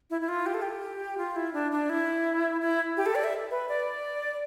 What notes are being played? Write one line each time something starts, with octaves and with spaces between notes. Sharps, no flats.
E4
E4
F4
G4
A4
G4
F4
E4
D4
D4
E4
E4
G4
A4
D5
E5
B4
D5